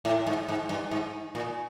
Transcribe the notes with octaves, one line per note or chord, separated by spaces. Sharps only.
A2
G#2
G#2
G2
G#2
A#2